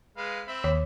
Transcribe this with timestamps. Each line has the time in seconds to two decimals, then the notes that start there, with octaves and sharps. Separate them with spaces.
0.17 G#3 B4 F5
0.48 C4 E5 B5
0.64 D#2 C#5